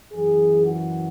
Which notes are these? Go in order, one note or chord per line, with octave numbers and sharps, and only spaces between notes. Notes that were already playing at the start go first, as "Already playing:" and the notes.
F#2 E3 G#4
F#4